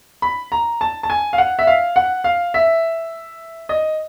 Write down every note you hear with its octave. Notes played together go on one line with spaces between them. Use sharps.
B5
A#5
A5
A5
G#5
F5
F#5
E5
F5
F#5
F5
E5
D#5